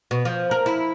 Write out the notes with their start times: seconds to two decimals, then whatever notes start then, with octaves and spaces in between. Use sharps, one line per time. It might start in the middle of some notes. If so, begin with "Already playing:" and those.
0.11 B2
0.25 F3
0.51 A#4
0.66 E4